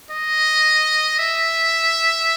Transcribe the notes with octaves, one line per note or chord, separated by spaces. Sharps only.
D#5
E5